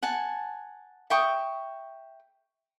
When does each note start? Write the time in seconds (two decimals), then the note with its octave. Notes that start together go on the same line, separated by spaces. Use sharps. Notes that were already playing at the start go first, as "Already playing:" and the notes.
0.02 F#5 G#5 A5
1.10 E5 G5 C#6 D#6